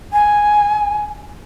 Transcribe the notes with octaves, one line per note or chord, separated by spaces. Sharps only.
G#5